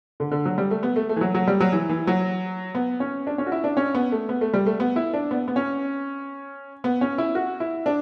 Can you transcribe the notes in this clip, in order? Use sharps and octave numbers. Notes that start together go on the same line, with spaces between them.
D3
D3
F#3
G3
A3
B3
A3
A3
E3
F#3
F#3
G3
F#3
E3
E3
F#3
B3
C#4
D4
C#4
F#4
E4
D4
C#4
B3
A3
B3
A3
G3
A3
B3
E4
D4
B3
B3
C#4
B3
C#4
E4
F#4
E4
D4